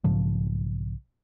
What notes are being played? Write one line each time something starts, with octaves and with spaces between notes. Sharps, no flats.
B1 G#2 C#3 F3